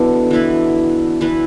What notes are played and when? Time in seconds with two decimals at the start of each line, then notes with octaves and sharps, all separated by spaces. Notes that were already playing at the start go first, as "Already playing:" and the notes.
Already playing: B2 D3 E3 E4
0.31 E3 B3 E4 B4
1.21 E3 B3 E4 B4